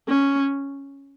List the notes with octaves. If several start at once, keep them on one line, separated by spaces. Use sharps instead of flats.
C#4